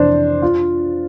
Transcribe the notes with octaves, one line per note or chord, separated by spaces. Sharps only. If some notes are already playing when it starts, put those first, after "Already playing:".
Already playing: F2 C3 E3 D4 C5
F4